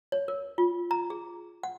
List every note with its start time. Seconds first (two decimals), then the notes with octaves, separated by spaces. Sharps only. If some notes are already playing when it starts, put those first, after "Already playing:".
0.12 C#5
0.28 A#4
0.58 F4
0.91 A#5
1.10 G#4
1.63 F#5